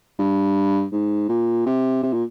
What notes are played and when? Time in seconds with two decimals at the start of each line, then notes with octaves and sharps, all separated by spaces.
0.19 G2
0.92 G#2
1.29 A#2
1.66 C3
2.03 C3
2.13 A#2